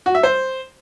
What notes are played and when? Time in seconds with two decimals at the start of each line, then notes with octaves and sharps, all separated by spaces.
0.06 F#4
0.15 E5
0.23 C5